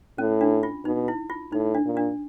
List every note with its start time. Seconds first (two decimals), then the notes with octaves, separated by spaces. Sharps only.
0.18 A2 C#4
0.41 D4
0.63 F4
0.85 B2 D#4
1.08 E4
1.30 F4
1.52 A2 D#4
1.75 D4
1.86 A#2
1.97 D4